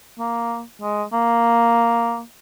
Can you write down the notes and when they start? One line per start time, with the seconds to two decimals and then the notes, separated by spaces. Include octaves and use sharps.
0.19 A#3
0.82 G#3
1.13 A#3